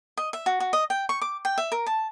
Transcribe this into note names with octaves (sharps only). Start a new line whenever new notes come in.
D#5
E5
F#4
F#4
D#5
G5
C#6
D6
G5
E5
A#4
A5